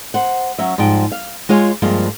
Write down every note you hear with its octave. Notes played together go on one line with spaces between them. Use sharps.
C5 F#5
F#3 C#4 E5
G#2 F3 G3 G5
F5
G#3 F4 C#5 G#5
G2 F3 G#3 A#3